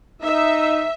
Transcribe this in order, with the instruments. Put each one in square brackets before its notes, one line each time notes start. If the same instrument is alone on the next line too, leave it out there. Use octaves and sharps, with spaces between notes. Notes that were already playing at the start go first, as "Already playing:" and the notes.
[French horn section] D#4 [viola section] E5